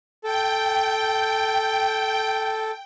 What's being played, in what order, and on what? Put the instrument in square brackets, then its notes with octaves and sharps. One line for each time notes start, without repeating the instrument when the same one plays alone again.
[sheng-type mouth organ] A4 [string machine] G5